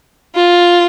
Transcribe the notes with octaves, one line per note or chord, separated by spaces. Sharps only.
F4